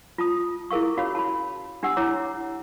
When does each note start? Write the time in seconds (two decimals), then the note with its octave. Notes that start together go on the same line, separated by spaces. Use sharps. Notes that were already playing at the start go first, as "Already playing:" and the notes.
0.18 F4 A5 D#6
0.70 E4 G#4 A#4 F5 C#6
0.97 C#4 F#4 C#5 F5 B5
1.15 A5 B5
1.83 D4 G4 F#5 E6
1.97 E4 C#5 F#5 A#5 D6